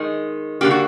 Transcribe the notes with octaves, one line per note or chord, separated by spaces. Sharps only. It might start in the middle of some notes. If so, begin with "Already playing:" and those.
Already playing: D#3 G#3
D3 G3 A#3 G4
F#4